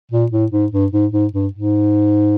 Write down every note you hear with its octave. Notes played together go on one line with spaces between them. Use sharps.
A#2
A2
G#2
G2
G#2
G#2
G2
G#2